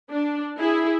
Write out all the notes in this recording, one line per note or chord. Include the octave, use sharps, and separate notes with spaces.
D4
E4 G#4